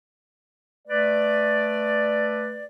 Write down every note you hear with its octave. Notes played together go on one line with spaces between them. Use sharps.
A3 B4 D5